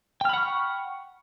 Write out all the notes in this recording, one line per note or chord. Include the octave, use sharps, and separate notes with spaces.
F#5 G5 B5 C#6 F6